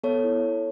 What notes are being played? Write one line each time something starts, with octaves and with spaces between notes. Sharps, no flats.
B3 A4 C#5
E4